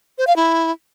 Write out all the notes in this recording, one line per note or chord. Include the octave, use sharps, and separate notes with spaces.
C5
F5
E4